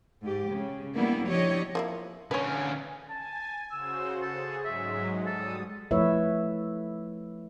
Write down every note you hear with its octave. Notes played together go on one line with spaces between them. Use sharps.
G#2 G4
C#3
G3 A#3 B3 D4 E4
F3 D4 E4 G4 C#5 D#5
F3 A#3 E4
D3 C#4 B4 C#5
G#5 A5
C#3 F#4 C5 E6
G#4 A4
G#2 F#3 G#3 E5
G3 A4 D#6
F3 A3 E4 B4 C#5 E5